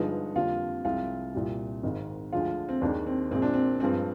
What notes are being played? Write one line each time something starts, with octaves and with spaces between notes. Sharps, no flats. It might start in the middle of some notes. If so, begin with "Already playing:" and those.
Already playing: G1 G2 D3 F3 G#3 D#4
F2 D3 G3 A#3 F4
C2 C3 F3 G#3 F4
C2 A#2 G3
G#1 G#2 D#3
D2 D3 F3 G#3 F4
C4
D#2 D#3 G#3 D4
C4
A#1 A#2 G#3 C4
D4
C4
G2 F3 G#3 C4